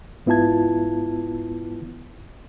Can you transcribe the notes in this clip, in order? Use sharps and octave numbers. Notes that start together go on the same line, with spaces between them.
G#2 B3 E4 F4 A5 G#6